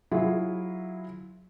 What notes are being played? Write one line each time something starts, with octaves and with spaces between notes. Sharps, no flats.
F#3 E4 F4 G#4